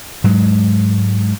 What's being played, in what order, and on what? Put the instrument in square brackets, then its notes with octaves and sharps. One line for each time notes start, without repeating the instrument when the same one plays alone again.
[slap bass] G#2 F#3 G#3